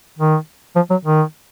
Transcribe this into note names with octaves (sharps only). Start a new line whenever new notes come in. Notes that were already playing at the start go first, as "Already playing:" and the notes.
D#3
F3
F#3
D#3